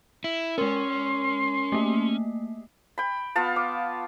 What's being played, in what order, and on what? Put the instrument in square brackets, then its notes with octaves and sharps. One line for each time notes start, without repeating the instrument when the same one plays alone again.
[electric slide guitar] E4
[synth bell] G#3 A#4 [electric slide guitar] C#4 [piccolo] C6
[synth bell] A3 A#3
[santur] G5 B5
B3 F4 F5 A5
D6